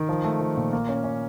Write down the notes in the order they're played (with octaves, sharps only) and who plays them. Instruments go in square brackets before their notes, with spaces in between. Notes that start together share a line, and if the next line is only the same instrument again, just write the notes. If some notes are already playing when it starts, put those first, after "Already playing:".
Already playing: [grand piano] D#3
F3
A3
F3
A#2
A#3
C#4
C#4